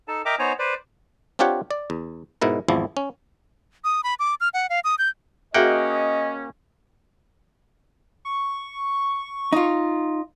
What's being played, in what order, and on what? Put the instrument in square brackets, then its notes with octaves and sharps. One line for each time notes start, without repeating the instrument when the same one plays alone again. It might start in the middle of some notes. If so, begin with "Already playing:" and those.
[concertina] D#4 A4 A5
A#4 D#5 E5 G5 A#5 D6
B3 D#4 C5 C#5 G#5 A#5
B4 C5 D5
[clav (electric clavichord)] C4 D4 F4 G4 C#5 F#5
D5
E2
G#2 B2 E4 A#4
G#1 E2 F3 E4
C#4
[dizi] D#6
B5
D6
F6
F#5
F5
D#6
G6
[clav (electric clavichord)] A#3 F#5 G5 [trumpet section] C#4 [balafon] F#4 G#4 E5 [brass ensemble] D#5
[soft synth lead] C#6
[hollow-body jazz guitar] D#4 F4